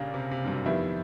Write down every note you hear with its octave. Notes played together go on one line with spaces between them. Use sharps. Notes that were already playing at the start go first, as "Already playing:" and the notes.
Already playing: A#2 C#3 G3 A#3 D4
C3
C3
G2
F#2
F2 D#3 G3 B3 E4